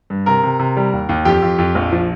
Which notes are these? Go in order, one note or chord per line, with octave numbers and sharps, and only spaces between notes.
G2
C3 A#4 A#5
C3
C3
G3
D#2
D#2
F2 G4 G5
F2
F2
A#1
F3